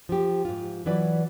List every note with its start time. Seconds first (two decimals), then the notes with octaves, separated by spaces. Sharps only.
0.09 F3 G4
0.45 G#2 F4
0.86 E3 F#3 E4 B4 D5